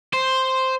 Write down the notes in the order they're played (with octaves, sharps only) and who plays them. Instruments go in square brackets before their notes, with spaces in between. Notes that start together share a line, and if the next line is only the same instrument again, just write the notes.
[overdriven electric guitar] C5